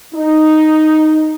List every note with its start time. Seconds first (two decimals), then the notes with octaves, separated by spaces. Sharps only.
0.15 D#4